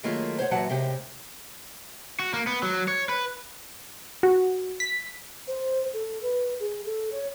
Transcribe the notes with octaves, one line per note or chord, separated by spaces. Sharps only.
D#3 F#3 A3 A#3 F4 G#4
C5 C#5 F#5
F#2 A#2 E3 F#3 F#5 A5
A2 C3 G#3 G4 A#4
F#4
A#3
B3
F#3
C#5
B4
F#4
B6
C5
A4
B4
G#4
A4
C#5